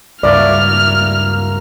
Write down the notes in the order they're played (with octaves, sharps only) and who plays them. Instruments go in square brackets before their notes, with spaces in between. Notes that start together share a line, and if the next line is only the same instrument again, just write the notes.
[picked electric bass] C#2 G2 [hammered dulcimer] A#3 E4 F#4 [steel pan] D5 [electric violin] F6